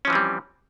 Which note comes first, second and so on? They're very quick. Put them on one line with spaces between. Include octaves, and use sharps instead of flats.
C#4 F3 E3 C4 G3